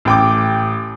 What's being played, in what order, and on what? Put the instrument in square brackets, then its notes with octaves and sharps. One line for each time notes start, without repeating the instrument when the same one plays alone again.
[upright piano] A1 G5 D6